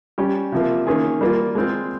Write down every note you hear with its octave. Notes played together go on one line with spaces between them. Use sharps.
G3 C#4 G4
C3 F3 A#3
D#3 A#3 C#4 F4 G#4
G3 A#3 F4
G#3 C4 F4